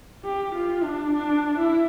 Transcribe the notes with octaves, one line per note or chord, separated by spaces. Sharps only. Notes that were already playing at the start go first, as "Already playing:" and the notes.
G4
F4
D4
D4
E4